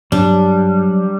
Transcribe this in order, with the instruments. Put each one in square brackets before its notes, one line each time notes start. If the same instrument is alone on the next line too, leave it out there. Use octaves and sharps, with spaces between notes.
[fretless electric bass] G2 [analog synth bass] F#3 [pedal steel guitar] G3 [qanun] D4